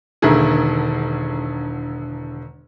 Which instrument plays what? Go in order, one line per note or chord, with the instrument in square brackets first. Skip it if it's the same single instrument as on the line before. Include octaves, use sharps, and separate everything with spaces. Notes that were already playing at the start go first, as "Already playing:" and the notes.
[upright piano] E1 D3 D#3 A#3 E4 G#4